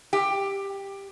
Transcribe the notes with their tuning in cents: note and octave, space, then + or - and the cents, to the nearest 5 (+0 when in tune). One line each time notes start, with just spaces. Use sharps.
G4 +10